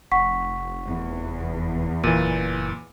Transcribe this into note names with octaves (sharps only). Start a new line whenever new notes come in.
F1 F#5 C#6 B6
E2
F#1 A#2 E3 D#7